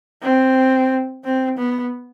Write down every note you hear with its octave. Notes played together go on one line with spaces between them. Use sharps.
C4
C4
B3